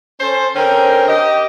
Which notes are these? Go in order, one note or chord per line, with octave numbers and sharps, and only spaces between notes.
C#4 A4 C5
D3 C4 C#4 A#4 G5
G4 D#5